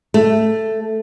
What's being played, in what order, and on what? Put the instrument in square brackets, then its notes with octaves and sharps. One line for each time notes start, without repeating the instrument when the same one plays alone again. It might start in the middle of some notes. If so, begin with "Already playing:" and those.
[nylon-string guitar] A3